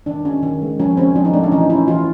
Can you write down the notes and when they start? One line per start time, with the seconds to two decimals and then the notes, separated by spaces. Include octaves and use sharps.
0.06 D#3 D4
0.25 C#4
0.43 D#3
0.62 G#3
0.79 F3 C#4
0.97 C4 C#4
1.15 F3 D4
1.25 D#4
1.33 A3 D4
1.43 C#4
1.52 E3 D#4
1.70 C#4 E4
1.88 E3 F4